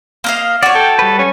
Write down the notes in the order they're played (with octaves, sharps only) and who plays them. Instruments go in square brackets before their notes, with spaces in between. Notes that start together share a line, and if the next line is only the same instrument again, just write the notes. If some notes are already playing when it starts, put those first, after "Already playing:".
[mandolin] A#3 D#5 F5
[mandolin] F#4 C#5 [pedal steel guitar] D5
[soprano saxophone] A4 [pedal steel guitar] G5
[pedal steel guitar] G3 B4
[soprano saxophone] C#4